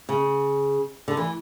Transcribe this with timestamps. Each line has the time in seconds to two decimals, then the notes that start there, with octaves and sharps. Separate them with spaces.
0.09 C#3
1.08 D3
1.17 E3